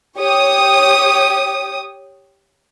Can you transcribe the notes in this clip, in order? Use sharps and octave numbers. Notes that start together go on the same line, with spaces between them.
G4 C#5 D#6